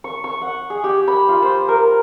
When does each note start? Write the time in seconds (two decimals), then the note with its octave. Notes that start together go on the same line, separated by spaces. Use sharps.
0.04 C#6
0.24 C#6
0.41 F#5
0.70 G#4
0.84 G4
1.08 B5
1.29 F4
1.42 C5
1.68 A#4